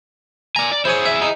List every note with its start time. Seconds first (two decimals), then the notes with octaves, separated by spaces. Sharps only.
0.56 D5 G#5 A#5
0.72 D5
0.85 E4 G#4 C5 C#5
1.05 E5
1.22 D#4